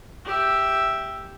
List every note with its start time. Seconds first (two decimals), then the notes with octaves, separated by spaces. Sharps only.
0.25 G4 E5